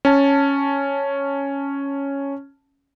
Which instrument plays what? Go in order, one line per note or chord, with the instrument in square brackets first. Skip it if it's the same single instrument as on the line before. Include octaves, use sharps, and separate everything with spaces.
[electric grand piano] C#4 A5